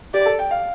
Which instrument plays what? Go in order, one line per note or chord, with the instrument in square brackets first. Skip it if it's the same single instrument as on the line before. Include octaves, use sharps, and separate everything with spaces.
[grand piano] G4 [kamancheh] D5
[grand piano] A4
G5
F5